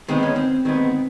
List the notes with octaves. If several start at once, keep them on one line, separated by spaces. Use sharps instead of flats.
D#3 G#3 B3 C4
C#4
C4
D#3 G#3 B3 C4